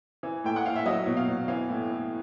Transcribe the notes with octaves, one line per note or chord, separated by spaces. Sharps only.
E3
A2 G5
F#5
A2 F5
E5
F#3 D#5
B2
F5
B2
E3 F5
A2
A2